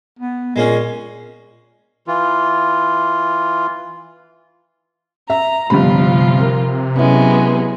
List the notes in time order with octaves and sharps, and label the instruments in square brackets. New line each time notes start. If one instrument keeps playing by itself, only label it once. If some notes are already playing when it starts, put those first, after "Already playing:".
[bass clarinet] B3
[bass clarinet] A#2 [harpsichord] G#3 A#3 C#4
[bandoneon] E3 F4
[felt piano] E5 [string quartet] A#5
[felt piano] G1 G3 B5 [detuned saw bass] C3 [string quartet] F3 F4
[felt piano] A#4
[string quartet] F#3 G#3 B3 [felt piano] C#4 E4